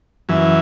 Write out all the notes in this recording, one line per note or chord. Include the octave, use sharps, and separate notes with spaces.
F#2 E3